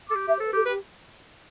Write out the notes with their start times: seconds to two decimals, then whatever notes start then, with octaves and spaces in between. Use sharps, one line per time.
0.08 A4 D6
0.15 G4
0.28 G4 E5
0.37 C5
0.40 A4
0.46 B4
0.53 G4 A4
0.65 G4 B4